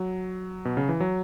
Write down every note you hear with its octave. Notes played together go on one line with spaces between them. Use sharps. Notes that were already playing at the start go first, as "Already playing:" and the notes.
Already playing: F#3
B2
C#3
E3
F#3